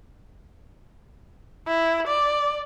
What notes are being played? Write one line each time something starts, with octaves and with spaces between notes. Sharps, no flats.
E4
D5